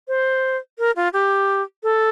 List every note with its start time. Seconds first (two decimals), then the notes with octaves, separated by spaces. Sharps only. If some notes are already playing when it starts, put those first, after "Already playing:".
0.08 C5
0.79 A#4
0.96 F4
1.13 G4
1.83 A4